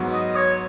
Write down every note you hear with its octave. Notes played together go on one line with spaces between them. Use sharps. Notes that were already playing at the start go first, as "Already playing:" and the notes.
Already playing: G#2 F#3 B3 F#4
D#5
C#5